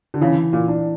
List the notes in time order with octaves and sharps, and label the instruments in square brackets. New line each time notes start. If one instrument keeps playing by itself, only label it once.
[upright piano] D3
[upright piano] C#3 [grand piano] E3
[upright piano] A#2
[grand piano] D4